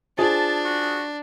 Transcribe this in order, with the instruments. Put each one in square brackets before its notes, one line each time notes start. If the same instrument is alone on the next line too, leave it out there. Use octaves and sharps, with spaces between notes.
[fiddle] D4 [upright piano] F4 G#4 C5 [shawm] A5
[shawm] F#4